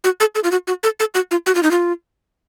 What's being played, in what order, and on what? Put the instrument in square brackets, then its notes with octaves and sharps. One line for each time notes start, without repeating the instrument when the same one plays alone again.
[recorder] F#4
A4
A4
F4
F#4
F#4
A4
A4
F#4
F4
F#4
F4
D#4
F4